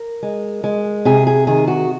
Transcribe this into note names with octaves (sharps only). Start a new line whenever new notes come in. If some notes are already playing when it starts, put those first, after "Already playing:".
Already playing: A#4
G#3
G#3
C3 G#4
G#4
D#3 G#4
F#4